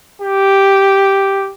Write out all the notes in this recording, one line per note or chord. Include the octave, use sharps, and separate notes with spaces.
G4